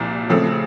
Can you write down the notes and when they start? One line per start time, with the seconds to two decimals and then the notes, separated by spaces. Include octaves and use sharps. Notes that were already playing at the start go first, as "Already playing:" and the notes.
Already playing: C2 A#2 F3
0.29 C#3 F3 A3 C4